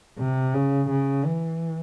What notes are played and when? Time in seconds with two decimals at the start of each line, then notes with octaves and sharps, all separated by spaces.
0.19 C3
0.54 C#3
0.90 C#3
1.25 E3